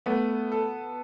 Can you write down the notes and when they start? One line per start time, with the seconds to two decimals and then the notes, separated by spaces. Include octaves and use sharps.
0.06 A3 B3
0.52 A4